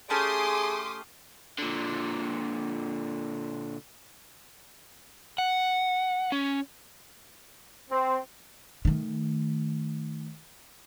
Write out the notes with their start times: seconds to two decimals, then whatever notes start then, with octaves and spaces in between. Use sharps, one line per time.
0.10 A3 C#4 G4 G#4 C6 D6 D#6
1.58 A#2 D3
5.38 F#5
6.32 C#4
7.90 C4
8.85 D#3 A3